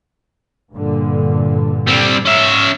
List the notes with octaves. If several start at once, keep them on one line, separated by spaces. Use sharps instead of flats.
G2 A#2 D3
G3 C4
C#4 E5